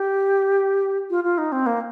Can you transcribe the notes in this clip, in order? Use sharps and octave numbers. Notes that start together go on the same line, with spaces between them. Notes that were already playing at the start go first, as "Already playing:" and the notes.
Already playing: G4
F4
F4
D#4
C4
A#3